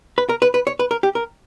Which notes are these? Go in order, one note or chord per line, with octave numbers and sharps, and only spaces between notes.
B4
A#4
B4
B4
C#5
B4
A#4
G4
A#4